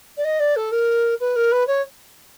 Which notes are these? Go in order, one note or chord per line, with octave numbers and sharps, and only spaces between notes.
D5
D#5
D5
A4
A#4
B4
A#4
B4
C#5